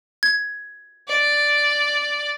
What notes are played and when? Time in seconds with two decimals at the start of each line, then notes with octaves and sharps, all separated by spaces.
0.23 G#6
1.08 D5